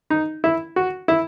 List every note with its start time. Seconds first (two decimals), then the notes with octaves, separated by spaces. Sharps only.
0.10 D#4
0.44 E4
0.76 F#4
1.08 E4